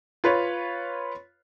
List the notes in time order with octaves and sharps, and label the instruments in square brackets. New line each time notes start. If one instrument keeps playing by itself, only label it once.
[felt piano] F4 B4 C#5